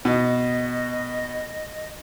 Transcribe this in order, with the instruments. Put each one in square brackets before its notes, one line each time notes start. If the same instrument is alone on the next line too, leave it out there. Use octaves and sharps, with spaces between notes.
[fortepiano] B2 [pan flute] D#5